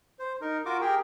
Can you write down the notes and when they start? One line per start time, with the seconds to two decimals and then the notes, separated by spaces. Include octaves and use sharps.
0.19 C5
0.41 D#4 A#4
0.65 F4 F#4 A#4 D6
0.81 G4 G#4 A#4 G5